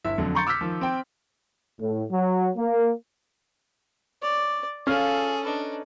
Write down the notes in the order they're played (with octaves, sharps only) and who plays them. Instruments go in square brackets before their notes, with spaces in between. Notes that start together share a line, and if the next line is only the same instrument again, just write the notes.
[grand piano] G1 E4 E5
F2 D3 F#3
A#5 C6 C#6 G6 A6 C#7
D6 E6 F6 G6 B6
D#3 F3
C4 G5
[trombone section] A2
F#3
A#3
[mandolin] C#5 [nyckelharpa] D5
[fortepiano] C#4 F6 [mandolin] F4 F5 [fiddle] G#4 [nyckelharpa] A4
[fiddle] D4 [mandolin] D#4 B4